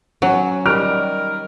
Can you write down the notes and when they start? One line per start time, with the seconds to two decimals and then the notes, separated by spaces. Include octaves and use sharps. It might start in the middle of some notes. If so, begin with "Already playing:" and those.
0.22 F#3 C#4
0.66 D#3 G3 A#4 F6 D7